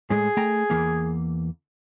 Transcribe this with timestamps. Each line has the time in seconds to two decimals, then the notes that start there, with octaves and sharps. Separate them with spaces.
0.10 A2 G#3 G#4
0.37 A3 G5 A#5
0.70 E2 E3 A#3